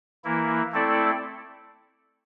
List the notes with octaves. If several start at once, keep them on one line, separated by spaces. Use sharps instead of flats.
E3 A#3 E4
A3 C4 E4 A4 D5